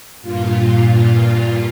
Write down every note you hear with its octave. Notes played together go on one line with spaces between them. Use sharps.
G2 A#2 F4